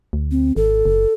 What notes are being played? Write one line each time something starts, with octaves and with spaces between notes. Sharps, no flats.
D2
C4
G#1 A4
F#1